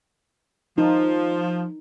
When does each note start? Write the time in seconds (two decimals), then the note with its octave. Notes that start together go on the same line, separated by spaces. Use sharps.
0.78 F3 D#4